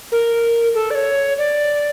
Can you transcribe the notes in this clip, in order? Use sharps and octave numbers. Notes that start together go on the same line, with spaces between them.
A#4
A4
D5
C#5
D5